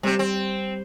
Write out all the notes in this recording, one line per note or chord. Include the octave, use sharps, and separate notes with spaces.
C3 G3 C4
C4